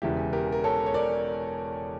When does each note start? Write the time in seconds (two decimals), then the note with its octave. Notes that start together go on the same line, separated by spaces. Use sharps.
0.02 E1 E2 C#3 E3 E4 G4
0.33 G4 A#4
0.52 A#4
0.64 A4 C#5
0.86 C#5
0.94 A#4 D5